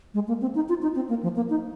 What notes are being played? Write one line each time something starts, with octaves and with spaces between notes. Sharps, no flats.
G#3
A#3
C4
D#4
F4
D#4
C4
A#3
F3
A#3
D#4